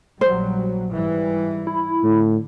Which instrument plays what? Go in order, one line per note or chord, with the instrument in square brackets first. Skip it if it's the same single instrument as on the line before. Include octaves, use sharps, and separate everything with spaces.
[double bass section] A#1 F#3 G3 [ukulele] C5
[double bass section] G#2 E3 G3
[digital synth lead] E4
[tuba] A2 [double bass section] D3